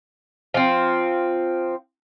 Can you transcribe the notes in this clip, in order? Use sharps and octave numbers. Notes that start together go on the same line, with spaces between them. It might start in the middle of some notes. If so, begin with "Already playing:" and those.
F3 C4